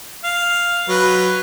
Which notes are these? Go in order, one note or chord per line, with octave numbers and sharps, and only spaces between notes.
F5
F#3 B4